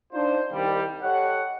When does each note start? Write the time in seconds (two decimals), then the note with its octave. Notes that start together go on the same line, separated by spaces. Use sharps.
0.13 D4 D#4 F4 C5
0.52 C2 D#3 G3
1.02 G4 A4 C#5 D#5 F#5